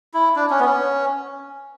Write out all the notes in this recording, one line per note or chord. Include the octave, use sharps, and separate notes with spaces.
E4
D4
C#4
B3
C#4